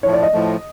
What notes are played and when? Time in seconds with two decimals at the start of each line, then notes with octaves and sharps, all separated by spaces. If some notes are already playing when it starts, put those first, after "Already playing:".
0.03 A2 F3 A3 C#5
0.13 D5
0.23 D#5
0.33 A2 F3 A3